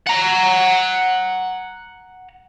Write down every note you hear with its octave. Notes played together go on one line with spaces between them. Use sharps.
F#5 A#5